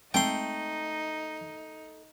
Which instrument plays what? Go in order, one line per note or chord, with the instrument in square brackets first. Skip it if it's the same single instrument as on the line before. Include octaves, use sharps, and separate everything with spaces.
[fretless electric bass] G#3 C4 [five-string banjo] A3 [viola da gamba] D#4 [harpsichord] G5 C6